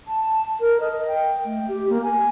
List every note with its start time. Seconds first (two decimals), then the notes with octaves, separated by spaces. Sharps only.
0.07 A5
0.60 A#4
0.81 D#5
1.08 G5
1.45 A3
1.68 G4
1.89 A#3
2.03 G#5